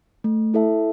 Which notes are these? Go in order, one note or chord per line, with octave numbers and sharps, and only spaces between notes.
A3
E4 A4 E5 A5